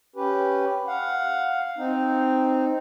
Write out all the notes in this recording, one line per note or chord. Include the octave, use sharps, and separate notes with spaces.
C#4 G4 B4
F5 F#5
C4 D#4